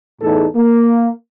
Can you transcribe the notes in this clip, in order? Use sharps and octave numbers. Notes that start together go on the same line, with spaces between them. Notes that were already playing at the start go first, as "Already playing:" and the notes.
E2 A2 D#4 G#4 A4
A#3